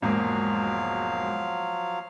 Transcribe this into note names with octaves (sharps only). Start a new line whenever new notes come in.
E1 G#2 F3 F#3 A#3 F5